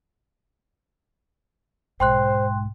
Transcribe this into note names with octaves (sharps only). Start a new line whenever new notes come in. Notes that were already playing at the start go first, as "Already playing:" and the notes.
B1 G#2 C5 G5 C6 F#6